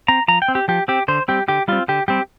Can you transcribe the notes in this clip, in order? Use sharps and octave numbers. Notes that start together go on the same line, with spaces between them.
C4 A#5
F3 A#5
G5
C4
G4
F3 G4
C4 G4
D3 C5
G3 C4 G4
D3 G4
G3 C4 F4
D3 G4
G3 C4 G4